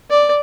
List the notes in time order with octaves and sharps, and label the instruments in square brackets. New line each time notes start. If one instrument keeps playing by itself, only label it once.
[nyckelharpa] D5